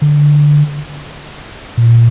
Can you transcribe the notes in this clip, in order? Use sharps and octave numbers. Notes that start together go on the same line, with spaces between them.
D3
A#2